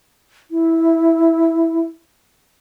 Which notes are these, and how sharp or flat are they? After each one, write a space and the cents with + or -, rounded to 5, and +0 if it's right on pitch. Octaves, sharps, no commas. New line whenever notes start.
E4 -10